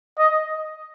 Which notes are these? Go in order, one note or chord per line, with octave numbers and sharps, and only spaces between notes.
D#5